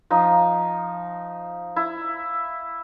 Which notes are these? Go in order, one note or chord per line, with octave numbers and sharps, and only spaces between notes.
F3 D#4
E4